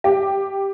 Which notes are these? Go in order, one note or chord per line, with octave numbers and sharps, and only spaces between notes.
G4